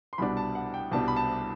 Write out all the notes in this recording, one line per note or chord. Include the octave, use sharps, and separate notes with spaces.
C6
C2 B2 G3 B3 D4 B5
A5
F#5
G5
C2 B2 G3 B3 D4 A5
B5
A5